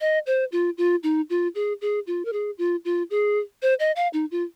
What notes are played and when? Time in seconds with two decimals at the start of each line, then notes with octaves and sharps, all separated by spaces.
0.01 D#5
0.27 C5
0.52 F4
0.78 F4
1.03 D#4
1.30 F4
1.55 G#4
1.81 G#4
2.07 F4
2.25 A#4
2.33 G#4
2.58 F4
2.85 F4
3.10 G#4
3.62 C5
3.80 D#5
3.96 F5
4.13 D#4
4.31 F4